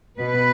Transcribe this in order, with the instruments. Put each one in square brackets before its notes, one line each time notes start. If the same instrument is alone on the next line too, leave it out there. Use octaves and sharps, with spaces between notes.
[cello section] B2 B4